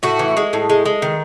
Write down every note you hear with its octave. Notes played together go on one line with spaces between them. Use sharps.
A2 F#4
E3
G#3
A2
G#3
G#3
D#3